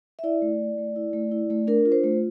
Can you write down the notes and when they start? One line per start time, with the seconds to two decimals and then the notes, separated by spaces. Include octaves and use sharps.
0.19 E5
0.23 E4 D5
0.42 A3
0.60 E4
0.78 A3
0.96 E4
1.13 A3
1.31 E4
1.50 A3
1.67 D4 A#4
1.85 F4
1.92 C5
2.04 A3